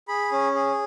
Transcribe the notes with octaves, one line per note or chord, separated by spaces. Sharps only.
G#4 B5
C#4
G#4